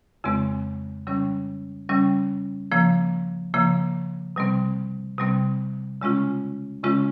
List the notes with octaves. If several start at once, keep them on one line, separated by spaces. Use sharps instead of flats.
F2 C#3 G#3 C4
C#3 G3 C#4
C#3 G3 C#4
C#3 F3 A#3
C#3 F3 A#3
C3 G3 C4
C3 G3 C4
C#3 G#3 C#4 F4
C#3 G#3 C#4 F4